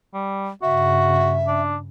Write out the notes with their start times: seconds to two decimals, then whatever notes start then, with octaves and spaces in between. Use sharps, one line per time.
0.14 G3
0.62 G2 C#3 F#4 E5
1.47 D4